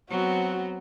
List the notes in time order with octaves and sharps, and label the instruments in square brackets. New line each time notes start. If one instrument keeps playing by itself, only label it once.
[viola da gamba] F#3 B3 C4 [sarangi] F#4